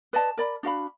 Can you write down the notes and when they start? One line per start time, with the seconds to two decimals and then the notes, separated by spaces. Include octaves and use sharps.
0.13 B4 D5 D#5 A5
0.37 A#4 D5 B5
0.63 D4 F#4 F5 B5